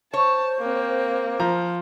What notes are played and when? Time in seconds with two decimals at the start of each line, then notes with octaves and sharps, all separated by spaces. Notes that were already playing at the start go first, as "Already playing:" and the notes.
0.14 C5 C#5 A5
0.59 A#3 C4
1.40 F3 A#5